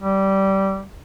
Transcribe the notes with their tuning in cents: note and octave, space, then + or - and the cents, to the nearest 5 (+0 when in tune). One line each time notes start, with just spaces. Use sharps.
G3 -15